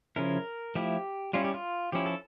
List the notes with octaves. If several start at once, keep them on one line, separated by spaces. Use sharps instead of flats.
C#3 F3 C#4 E4 A#4
F3 A3 E4 G4
G3 C#4 E4 F4
G4
F4
F3 C#4 E4 G4
A4